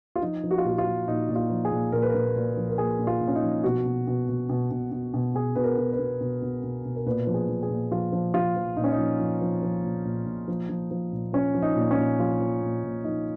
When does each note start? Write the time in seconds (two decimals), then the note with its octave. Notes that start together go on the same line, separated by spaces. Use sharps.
0.16 F4
0.22 F3 D#4
0.44 F3
0.51 F#4
0.58 F4
0.64 A#2 F#4
0.78 F4
0.86 F3
1.07 A#2 D#4
1.29 A#2
1.35 F4
1.50 F3
1.65 G#4
1.71 A#2
1.92 A#2 A#4
2.02 B4
2.10 A#2 A#4
2.36 A#2
2.57 F3
2.69 A#4
2.78 A#2 G#4
2.99 A#2
3.07 F4
3.21 A#2
3.28 C#4
3.35 D#4
3.43 F3
3.64 B2 F#4
3.85 B2
4.07 B2
4.29 B2
4.49 B2
4.71 B2
4.92 B2
5.14 B2
5.35 B2 G#4
5.55 B2 B4
5.64 A#4
5.78 B2
5.93 B4
5.99 B2
6.21 B2
6.42 B2
6.63 B2
6.85 B2
6.96 A#4
7.06 A#2 B4
7.27 F3
7.34 G#4
7.49 F3
7.63 G#4
7.70 A#2
7.91 F3 F4
8.12 F3
8.34 F3 F4
8.56 F3
8.77 A#2 D#4
8.84 C#4
8.92 D#4
8.98 F3
9.20 F3
9.41 F3
9.63 F3
9.84 A#2
10.05 A#2
10.26 A#2
10.48 F3
10.69 F3
10.91 F3
11.12 A#2
11.33 F3 C#4
11.54 F3
11.62 D#4
11.76 A#2
11.91 C#4
11.98 A#2
12.19 F3 F4
12.40 F3
12.62 A#2
12.84 A#2
13.04 F3 D#4